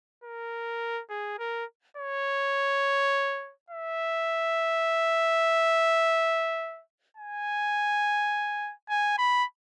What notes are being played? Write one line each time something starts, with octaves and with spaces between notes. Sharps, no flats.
A#4
G#4
A#4
C#5
E5
G#5
G#5
B5